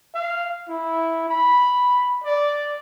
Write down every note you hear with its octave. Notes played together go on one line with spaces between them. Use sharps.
F5
E4
B5
D5